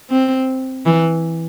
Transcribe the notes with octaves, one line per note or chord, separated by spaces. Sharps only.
C4
E3